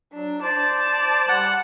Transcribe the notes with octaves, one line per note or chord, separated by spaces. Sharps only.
F#3 D4
C5 D5 A5
G3 F#5